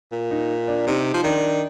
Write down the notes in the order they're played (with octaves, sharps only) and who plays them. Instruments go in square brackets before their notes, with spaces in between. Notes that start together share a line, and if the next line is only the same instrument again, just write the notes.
[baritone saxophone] A#2
[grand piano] D#4
D4
[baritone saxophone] C3 [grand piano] D#4
[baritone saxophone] F3
[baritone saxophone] D#3 [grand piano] D4